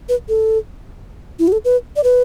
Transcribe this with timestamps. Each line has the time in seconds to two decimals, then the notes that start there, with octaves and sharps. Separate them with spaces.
0.09 B4
0.29 A4
1.39 E4
1.48 F#4
1.52 A4
1.65 B4
1.96 D5
2.04 B4